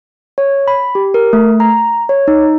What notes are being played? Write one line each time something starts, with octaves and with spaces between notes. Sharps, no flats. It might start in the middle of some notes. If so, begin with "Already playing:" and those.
C#5
B5
G4
A#4
A3
A#5
C#5
D#4